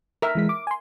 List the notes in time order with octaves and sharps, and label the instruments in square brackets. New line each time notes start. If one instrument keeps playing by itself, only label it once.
[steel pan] A#4 E5
[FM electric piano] E3 G#3 B6
D6
G#5 C6